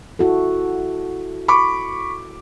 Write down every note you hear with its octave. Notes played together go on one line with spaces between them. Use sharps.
E4 F#4 A4
B5 C#6 D6